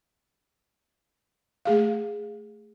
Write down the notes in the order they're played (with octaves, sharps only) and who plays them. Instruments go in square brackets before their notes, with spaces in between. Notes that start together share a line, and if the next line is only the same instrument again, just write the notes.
[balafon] A3 G#4 F5